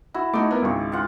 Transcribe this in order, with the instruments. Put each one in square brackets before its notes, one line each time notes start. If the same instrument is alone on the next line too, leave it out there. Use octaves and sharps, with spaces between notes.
[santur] E4 [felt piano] F#4
[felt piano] A3 D#4 F#4 [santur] D6
[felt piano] B3 A#4
G#1 C#2 C#6
[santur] F4 F#5